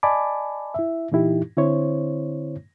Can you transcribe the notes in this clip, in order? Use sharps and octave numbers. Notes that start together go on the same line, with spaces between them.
D5 D#5 G#5 A5 B5 D6
E4 E5
A#2 E3 D#4 E4 G4
D3 C4 E4 C5 C#5